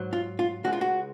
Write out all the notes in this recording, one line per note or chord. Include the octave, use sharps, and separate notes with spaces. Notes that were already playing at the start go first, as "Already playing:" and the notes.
Already playing: G#2 F#3
F4
F4
C#2 C#3 G#3 F#4
F4
F#4